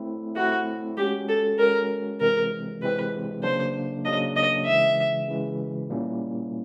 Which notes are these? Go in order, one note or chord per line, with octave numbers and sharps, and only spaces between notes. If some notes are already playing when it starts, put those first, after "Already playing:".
Already playing: A3 C4 E4
A3 C4 E4 F#4
G#3 C#4 F#4 G4
A4
G#3 C#4 F#4 A#4
C3 E3 G#3 C4 A#4
C3 E3 G#3 C4 B4
C#3 F#3 A#3 D4 C5
C#3 F#3 A#3 D4 D#5
D#5
C#3 E3 G#3 E5
C#3 E3 G#3
A#2 G3 A#3 C#4 E4